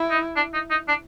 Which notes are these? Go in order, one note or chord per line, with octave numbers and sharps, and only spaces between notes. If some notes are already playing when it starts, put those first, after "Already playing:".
Already playing: E4
D#4
D4
D#4
D#4
D4